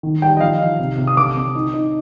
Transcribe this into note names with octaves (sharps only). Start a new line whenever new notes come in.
D#3
G3 G5
D#5
F3 F5
D#4
C3
C3
D#6
D3 D6
C4
D#4
D#4